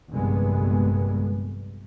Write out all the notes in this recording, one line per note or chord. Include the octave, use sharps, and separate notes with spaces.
F1 A#1 G2 D3 G#3 B3